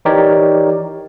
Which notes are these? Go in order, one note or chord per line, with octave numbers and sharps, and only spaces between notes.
E3 D#4 G4 A#4 C#5 D5